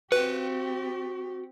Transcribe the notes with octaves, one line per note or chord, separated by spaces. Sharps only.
C4 F#4 G4 B4 G5